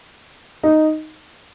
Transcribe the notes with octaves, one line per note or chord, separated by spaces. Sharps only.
D#4